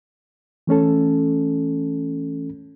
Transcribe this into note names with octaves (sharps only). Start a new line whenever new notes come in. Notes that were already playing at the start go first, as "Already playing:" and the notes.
E3 A3 C#4 A4